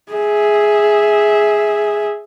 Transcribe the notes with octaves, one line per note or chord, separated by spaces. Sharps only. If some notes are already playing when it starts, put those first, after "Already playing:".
G#4 E5